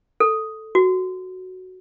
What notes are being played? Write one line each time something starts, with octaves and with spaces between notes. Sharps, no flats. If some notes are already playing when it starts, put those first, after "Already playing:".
A4
F#4